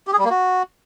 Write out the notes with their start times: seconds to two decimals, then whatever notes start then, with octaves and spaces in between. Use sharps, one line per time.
0.07 G4
0.13 G#4
0.19 G3
0.24 A#3
0.30 F#4